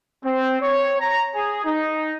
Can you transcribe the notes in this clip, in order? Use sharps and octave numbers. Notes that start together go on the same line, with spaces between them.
C4
C#5
A#5
G#4
D#4